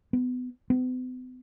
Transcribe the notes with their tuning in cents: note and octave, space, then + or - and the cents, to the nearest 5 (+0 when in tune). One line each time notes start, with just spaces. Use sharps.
B3 +25
B3 +45